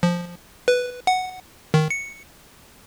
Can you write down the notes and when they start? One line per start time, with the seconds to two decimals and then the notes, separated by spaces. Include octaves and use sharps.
0.03 F3
0.68 B4
1.07 F#5
1.74 D#3
1.90 C#7